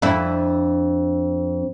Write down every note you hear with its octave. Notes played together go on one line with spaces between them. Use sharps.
F2 D4 E4